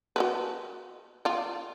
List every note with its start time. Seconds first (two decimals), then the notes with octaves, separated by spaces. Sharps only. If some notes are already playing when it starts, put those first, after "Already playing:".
0.16 F#4 A#4 B4
1.25 F4 D5